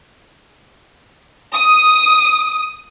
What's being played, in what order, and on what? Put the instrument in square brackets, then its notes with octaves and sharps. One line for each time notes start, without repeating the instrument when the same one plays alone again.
[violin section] D#6